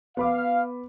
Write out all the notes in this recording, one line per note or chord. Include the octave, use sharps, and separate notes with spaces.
B3 F5 B5 D6